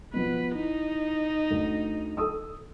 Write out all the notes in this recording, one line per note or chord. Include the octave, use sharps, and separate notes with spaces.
B2 F3 B3 B4
D#4 E4
D2
A4 D#6 E6